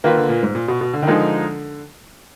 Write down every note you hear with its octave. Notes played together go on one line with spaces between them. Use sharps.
D#3 A#3 F4 B4
D3
A#2
G#2
A#2
B2
B2
D3
D#3
D3 F3 G#3 D#4 A#4